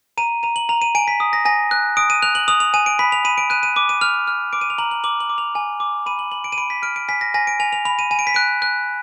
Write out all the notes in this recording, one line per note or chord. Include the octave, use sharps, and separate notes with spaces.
A#5 D#7
A#5 D#7
F#7
A#5 F7
D#7
G#5 D7
B6
D#6
A#6
G#5 A#6
F#6
D#6 D7
D#7
F#6 F7
F#7
D#6 F7
F7
G#5 D#7
D7
B5 B6
F7
B5 D#7
D7
F#6 D#7
D#7
D6 D#7
D#7
F6 F7
F6
D6 D7
D#7
F7
A#5 F#7
F#7
D6 F#7
F#7
D6
F7
G#5
D6
B5 D#7
F#7
B5 F#7
D7
D#7
B5 D7
B6
F6 D7
D7
G#5 B6
A#6
G#5 A#6
D7
G#5 F7
F7
B5 F7
D#7
G#5 D#7
D7
B6
F#6 D7
F#6